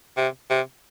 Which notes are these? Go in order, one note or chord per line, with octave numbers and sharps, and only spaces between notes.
C3
C3